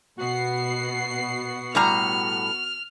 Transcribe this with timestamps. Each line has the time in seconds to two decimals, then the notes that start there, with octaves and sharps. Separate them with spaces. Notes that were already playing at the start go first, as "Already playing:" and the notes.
0.18 B2 B3 F#4 C7
1.75 A2 G3 A#5 F6